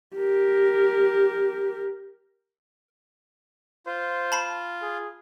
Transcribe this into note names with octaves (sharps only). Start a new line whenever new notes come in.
G4 A#4
F4 C5
A5 B5 C7
G#4